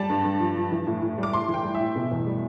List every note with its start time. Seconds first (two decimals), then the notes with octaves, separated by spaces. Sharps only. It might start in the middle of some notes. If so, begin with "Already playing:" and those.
Already playing: G3 A5
0.10 G2
0.25 G2
0.40 F3
0.56 F3
0.72 E3
0.87 A2
1.02 A2
1.18 G3
1.23 D6
1.33 A2 C6
1.48 E3
1.54 G5
1.64 G3
1.75 E5
1.80 A2
1.96 B2
2.11 E2
2.27 G3